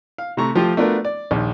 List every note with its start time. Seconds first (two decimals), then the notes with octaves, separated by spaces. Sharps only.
0.18 F5
0.37 C3 A3 A#5 C#6
0.55 F3 A3 F4 G4
0.77 A3 B3 D4 F4 F#4 A#4
1.05 D5
1.31 A#1 D#2